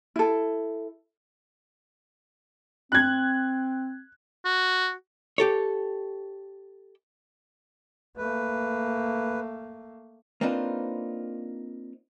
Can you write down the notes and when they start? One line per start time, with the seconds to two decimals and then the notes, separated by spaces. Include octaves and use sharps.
0.16 E4 A4
2.92 C4 F#6 G#6
4.45 F#4
5.38 G4 A4 C#5
8.17 A3 A#3 B4
10.41 A#3 C4 D4 D#4 F4 B4